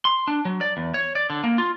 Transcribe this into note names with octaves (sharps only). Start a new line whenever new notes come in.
C6
D4
F#3
D5
E2
C#5
D5
D3
A#3
F4